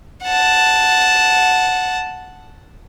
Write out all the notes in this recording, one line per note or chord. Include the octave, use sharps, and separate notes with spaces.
F#5 A5